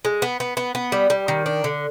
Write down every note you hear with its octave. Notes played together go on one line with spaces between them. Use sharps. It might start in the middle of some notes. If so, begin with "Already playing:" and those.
G#3
B3
B3
B3
B3
G3
G3
D#3
D4
D3